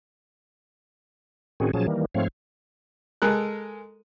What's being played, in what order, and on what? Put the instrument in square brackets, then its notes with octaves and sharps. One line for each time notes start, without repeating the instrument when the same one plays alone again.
[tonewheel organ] A2 D#3 C4 C#4 F#4 G#4
A#2 F3 F#3 C#4 G#4 A5
D#3 E3 G3 A#3
G#2 F3 A3 C4 C#5 F5
[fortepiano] G#3 A4 A#4 F#6